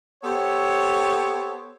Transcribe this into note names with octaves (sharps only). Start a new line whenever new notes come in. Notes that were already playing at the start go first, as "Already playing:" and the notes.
B3 G4 A4 C5 C#5